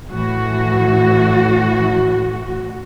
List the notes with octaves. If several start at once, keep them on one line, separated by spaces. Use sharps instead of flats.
A2 E3 F#4